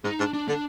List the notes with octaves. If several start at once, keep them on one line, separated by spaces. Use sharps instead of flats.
G#2 D#4
G#2 D4
D4
D3 D4